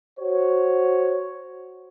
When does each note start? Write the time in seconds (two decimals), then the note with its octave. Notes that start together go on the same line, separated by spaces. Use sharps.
0.19 F#4 C5 C#5